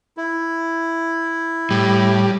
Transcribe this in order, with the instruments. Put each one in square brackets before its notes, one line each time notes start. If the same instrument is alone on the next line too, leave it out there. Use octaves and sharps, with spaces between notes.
[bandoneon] E4
[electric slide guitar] A2 [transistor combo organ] G3